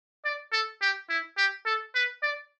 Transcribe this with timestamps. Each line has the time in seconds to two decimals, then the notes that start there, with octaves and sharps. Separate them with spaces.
0.25 D5
0.52 A4
0.82 G4
1.09 E4
1.38 G4
1.66 A4
1.95 B4
2.22 D5